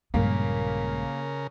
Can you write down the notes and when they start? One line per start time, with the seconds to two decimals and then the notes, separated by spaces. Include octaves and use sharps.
0.14 A#1 G2 A#2 C#3 G#3 A#3 A#4 B6